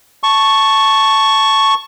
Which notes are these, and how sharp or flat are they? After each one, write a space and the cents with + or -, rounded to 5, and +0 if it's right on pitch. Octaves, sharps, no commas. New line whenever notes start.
A5 +0 C#6 +0